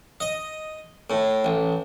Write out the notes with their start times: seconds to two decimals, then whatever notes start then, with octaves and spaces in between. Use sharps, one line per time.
0.20 D#5
1.10 A2
1.45 A1